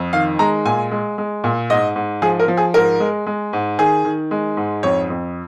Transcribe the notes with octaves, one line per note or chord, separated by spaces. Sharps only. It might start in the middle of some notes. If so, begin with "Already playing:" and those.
Already playing: F2
D#3 F5
G#3 A#5
A#2 G#5
G#3
G#3
A#2
G#2 D#5
G#2
F3 G#4
A#4
F3
G#4
G#2 A#4
G#3
G#3
G#2
D#3 G#4
D#3
G#3
G#2
F2 C#5
F2